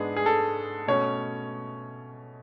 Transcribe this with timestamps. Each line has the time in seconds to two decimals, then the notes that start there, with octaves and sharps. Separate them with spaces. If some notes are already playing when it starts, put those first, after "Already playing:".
Already playing: G#2 G#3 B3 D4 G#4
0.16 G#4
0.26 A4
0.88 B2 A3 C#4 C#5